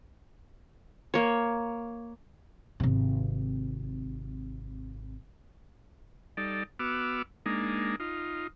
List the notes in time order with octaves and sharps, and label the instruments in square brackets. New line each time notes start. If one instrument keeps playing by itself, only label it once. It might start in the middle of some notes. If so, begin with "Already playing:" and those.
[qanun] A#3 C#5
[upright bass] G#1 C3
[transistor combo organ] G3 D#4 A4 D5
B3 F#4 D6 E6 F6
G#3 A#3 D4 D#4
D#4 F4